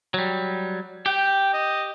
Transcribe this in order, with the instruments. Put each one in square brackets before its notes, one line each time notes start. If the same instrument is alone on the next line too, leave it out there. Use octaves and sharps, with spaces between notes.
[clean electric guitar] F#3 G3
[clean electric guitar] G4 [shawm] G5
[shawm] D#5